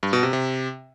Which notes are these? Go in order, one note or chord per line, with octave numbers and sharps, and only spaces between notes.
G2
B2
C3
C3